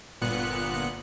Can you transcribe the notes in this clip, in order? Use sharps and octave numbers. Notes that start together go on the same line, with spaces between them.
G1 A#2 B3 F#6 C#7